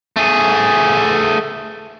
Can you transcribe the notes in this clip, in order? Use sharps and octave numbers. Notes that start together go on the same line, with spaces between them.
A3 G#4